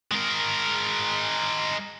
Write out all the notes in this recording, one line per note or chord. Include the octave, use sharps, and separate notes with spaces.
G#3 A#4